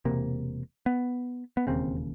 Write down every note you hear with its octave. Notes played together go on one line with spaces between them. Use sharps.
E1 E2 C3 A#3
B3
B3
E1 D#2 C#3 C4